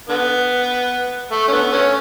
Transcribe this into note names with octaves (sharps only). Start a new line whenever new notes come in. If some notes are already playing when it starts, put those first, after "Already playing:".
D3 B3
A3
C#4
D3 B3
A3 C#4